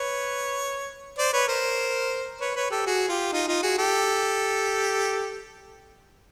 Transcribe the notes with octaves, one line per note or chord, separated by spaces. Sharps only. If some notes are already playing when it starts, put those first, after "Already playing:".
Already playing: B4 C#5
C5 D5
B4 C#5
A#4 C5
B4 C#5
B4 C#5
G4 A4
F#4 G#4
F4 G4
D#4 F4
D#4 F4
F#4 G#4
G4 A4